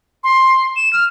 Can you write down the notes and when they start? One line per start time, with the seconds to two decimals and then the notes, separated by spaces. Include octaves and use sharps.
0.24 C6
0.76 E7
0.93 F6